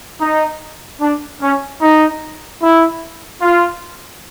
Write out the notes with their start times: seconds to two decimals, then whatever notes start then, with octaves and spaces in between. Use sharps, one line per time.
0.20 D#4
1.01 D4
1.42 C#4
1.82 D#4
2.62 E4
3.42 F4